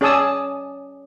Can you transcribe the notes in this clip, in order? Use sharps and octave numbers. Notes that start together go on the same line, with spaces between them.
C#4 G#4 D5 A5 D#6 E6